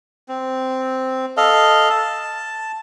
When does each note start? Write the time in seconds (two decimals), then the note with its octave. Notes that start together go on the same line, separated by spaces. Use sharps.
0.28 C4
1.37 A4 D#5 F5
1.90 A5